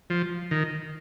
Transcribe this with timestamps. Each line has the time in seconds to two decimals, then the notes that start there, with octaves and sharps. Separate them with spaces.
0.10 F3
0.51 D#3